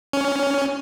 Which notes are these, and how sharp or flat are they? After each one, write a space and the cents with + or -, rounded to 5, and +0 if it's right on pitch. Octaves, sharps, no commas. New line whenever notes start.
C#4 +15